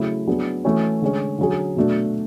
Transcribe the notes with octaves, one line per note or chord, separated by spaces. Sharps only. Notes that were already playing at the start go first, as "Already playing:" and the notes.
Already playing: C#3 F#3 A3 E4
F#3 B3 D4 G#4
E3 A3 C#4 F#4
D3 G#3 C#4
D3 F#3 C#4 G#4
B2 F#3 A3 D4